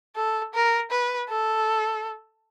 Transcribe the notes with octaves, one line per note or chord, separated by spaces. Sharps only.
A4
A#4
B4
A4